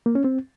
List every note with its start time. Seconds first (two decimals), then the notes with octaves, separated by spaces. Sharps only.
0.06 A#3
0.15 C#4
0.24 C4